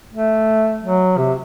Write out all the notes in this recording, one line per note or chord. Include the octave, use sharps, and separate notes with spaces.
A3
F#3
C3